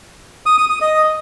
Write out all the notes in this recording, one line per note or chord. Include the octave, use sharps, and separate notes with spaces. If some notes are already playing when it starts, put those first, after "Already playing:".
D#6
D#6
D#6
D#5